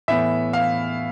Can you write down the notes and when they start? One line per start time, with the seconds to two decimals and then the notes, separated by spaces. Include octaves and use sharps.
0.08 A2 E3 B3 E5
0.53 F5